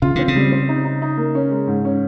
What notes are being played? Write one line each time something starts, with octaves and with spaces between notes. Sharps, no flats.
C#3 F4
D3 C4
C#3
G3
C4
D#4
D#4
D#4
A#3
C#4
G#3
G#2
C#4